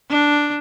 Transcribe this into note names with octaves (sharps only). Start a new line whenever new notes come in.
D4